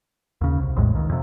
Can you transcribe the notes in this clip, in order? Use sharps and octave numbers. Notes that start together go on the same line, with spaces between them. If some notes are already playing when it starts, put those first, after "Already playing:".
D#2 C#3
C2
A#1 E2 A2 G#3
C#2 D#3
F2 C3